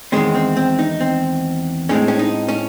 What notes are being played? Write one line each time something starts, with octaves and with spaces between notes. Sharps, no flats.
E2 D#3 G#3 C4 C#4
C4
C4
D#4
C4
A2 G#3 C4 C#4
C#4
D#4
C#4